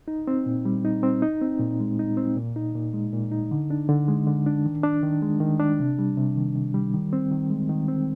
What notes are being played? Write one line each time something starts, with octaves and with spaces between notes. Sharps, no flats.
D#4
C4
A#2
G3
D#4
C4
D#4
C4
A#2
G#3
D#4
C4
A#2
D#4
A#2
G#3
A#2
D#4
D3
D4
D3
G#3
D3
D4
D#3
D4
D#3
G#3
D#3
D4
C3
G3
C3
D#3
C3
G3
D#3
C4
D#3
G#3
D#3
C4